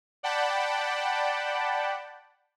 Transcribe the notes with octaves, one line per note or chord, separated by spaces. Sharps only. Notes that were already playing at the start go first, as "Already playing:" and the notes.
D5 F#5 G5 A5 B5